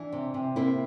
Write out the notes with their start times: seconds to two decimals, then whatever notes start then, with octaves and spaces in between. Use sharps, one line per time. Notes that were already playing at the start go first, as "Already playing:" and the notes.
Already playing: E3 D4
0.12 C3
0.34 C3
0.56 A#3 C4 E4